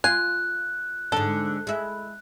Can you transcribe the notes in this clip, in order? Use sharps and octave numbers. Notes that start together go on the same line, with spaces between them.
F4 G#5 F#6
G#2 D3 A4
G#3 E4